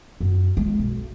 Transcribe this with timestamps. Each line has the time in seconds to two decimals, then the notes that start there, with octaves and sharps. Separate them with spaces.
0.20 F#2
0.57 G#3
0.79 B1